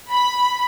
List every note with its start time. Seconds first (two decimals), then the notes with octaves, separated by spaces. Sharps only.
0.10 B5